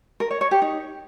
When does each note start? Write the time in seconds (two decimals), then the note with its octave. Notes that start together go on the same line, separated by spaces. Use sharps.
0.20 A#4
0.31 C#5
0.41 C#5
0.51 G4
0.62 D#4